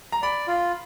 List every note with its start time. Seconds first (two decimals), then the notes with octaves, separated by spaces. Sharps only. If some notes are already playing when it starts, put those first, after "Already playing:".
0.12 A#5
0.22 D5 B5
0.48 F4